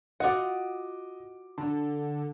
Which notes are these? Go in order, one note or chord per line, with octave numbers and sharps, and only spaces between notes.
F4 F#4 D#5 F#5 D6
D3 A5